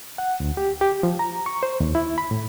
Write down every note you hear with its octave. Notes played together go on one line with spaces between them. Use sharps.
F#5
D2
G4
G4
F3
A#5
C#6
C5
D#2
E4
B5
A2